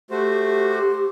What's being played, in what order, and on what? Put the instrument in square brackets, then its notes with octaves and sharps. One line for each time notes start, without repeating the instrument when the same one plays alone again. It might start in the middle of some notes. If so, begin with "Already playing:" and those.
[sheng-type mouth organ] A3 F#4 C5 [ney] G4